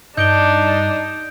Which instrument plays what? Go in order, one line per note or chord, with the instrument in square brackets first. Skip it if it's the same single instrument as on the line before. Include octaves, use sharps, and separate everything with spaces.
[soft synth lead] G2 [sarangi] D4 [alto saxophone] D#4 [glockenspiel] G6 D7 G7